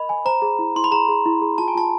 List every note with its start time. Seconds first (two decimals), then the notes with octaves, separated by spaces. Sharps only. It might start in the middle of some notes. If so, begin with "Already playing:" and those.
Already playing: A#4 D#5 B5
0.09 G#5
0.25 C5 A#5
0.42 G#4
0.59 E4
0.76 E4 C6
0.84 B5
0.91 G#4 A#5
1.09 G#4
1.26 E4
1.42 G#4
1.58 F4 A5
1.68 G#5
1.75 F4 A5